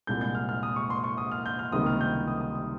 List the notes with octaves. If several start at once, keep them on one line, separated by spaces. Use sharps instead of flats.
C2 A#2 G#3 G6
G6
F6
F6
D#6
C#6
C6
C#6
D#6
F6
G6
F6
C#2 C3 D#3 G3 A#3 D#6
F6
G6
F6
D#6
D#6
D#6